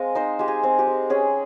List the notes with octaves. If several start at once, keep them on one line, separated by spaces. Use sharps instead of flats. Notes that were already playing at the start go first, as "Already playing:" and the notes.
Already playing: G#3 C4 D#5 F5
D#4 C5
G#3 G4
G#4
C4
G4
G#3
C#4 G#4